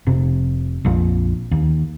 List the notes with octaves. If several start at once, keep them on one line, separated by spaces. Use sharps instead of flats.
F1 C3
A#1 F2
D#2